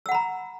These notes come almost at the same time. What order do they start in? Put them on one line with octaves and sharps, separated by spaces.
E6 F#5 B5 A#5